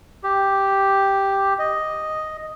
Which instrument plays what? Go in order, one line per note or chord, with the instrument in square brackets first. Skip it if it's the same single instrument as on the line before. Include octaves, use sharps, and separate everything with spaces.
[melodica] G4
D#5